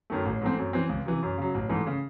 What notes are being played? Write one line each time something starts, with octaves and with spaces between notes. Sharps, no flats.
F#2 D#3 A3
A1
G#2 E3 A3 C4
F#2
E3 C4
C#2
C3 E3
F#2
C#3 F#3
A1
G#2 E3 A3
C#3